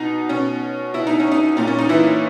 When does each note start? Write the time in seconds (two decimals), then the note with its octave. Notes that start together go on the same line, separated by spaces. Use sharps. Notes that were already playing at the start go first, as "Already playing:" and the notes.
Already playing: B2 D#4
0.29 B2 C#4
0.94 B2 E4
1.07 D#4
1.20 C#4
1.32 D#4
1.57 A#2 D#4
1.67 C#4
1.79 D#4
1.89 E3 E4